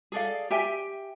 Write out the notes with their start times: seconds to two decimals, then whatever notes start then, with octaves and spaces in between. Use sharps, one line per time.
0.12 G#4 A4 D5 F5
0.50 G4 E5 G5 G#5